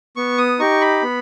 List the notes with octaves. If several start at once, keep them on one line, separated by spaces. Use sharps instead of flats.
B3 C#6
D#6
D#4 G4 C#6
B5
B3